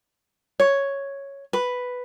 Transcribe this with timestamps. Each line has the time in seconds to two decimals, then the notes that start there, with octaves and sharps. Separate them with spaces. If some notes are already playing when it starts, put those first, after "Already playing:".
0.60 C#5
1.53 B4